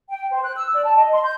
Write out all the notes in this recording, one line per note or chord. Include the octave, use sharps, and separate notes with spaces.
G5
C5
F#6
E6
D5
A5
D#5
C6
G6